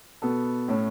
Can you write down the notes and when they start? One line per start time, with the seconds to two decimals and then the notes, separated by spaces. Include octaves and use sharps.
0.22 B2 B3 A4
0.68 A2 A3 C#4 A4